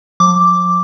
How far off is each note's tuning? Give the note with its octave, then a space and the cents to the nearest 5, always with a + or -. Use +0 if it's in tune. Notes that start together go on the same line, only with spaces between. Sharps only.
F3 +45 D6 +0